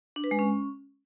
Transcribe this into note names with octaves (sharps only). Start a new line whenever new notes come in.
D4
B4
G#3
C#4